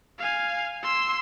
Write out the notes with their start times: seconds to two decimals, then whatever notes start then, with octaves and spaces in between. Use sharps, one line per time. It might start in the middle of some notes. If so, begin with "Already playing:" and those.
0.19 F5 G#5
0.83 C6 E6